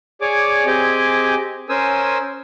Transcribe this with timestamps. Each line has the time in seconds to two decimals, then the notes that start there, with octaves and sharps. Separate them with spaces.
0.21 G#4 C#5 D5 G#5 D6
0.67 C4 G4 G#4 D#5 G#5 D6
1.69 C#4 A#4 C5 G#5 D#6 E6